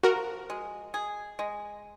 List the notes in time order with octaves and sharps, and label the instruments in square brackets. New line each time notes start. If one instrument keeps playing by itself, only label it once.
[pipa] F3 [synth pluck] F#4 A#4
[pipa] G#3
G#4
G#3